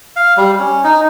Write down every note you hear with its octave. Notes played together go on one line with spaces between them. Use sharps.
F5
G3
C#4
D#4